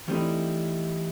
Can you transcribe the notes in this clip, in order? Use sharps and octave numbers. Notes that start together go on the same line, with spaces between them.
E3 G3 A3 C4 D#4 E4